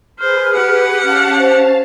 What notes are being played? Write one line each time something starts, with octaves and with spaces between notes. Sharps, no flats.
G#4 B4 C5 F6
G4 F#5
C#4 F5 A5 F6
C5